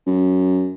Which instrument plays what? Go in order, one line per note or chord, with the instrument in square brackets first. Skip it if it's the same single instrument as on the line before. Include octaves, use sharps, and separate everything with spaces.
[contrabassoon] F#2